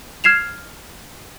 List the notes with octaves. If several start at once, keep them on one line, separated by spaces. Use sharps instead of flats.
F6 G#6 C7 E7 F7